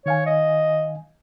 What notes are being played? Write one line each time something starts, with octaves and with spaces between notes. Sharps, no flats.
D#3 C#5 F5 G#5
D#5